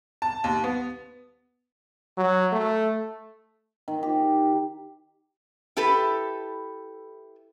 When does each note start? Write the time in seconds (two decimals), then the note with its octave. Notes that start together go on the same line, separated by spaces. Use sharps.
0.22 A5
0.44 D#2
0.64 B3
2.18 F#3
2.53 A3
3.88 D#3
4.03 G4
5.77 E4 G4 A4 B4